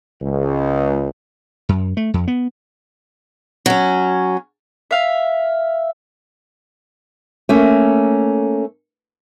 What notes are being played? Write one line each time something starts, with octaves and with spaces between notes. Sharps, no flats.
C#2
F#2
A3
F2
B3
F#3 C#4
E5 F5
A3 A#3 C#4